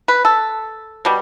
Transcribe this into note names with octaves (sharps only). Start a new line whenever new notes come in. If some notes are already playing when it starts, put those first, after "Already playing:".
B4
A4
B2 G3